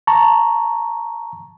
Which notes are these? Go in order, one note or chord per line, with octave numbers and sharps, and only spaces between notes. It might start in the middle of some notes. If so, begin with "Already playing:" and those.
A5 A#5 C#6